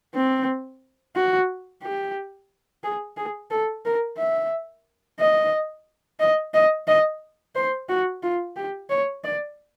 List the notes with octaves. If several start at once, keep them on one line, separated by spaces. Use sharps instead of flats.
C4
F#4
G4
G#4
G#4
A4
A#4
E5
D#5
D#5
D#5
D#5
C5
F#4
F4
G4
C#5
D5